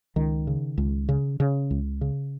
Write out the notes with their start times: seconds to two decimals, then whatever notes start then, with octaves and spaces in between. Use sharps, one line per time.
0.16 C#2 D#3
0.47 C#3
0.78 C#2
1.09 C#3
1.40 C#3
1.71 C#2
2.01 C#3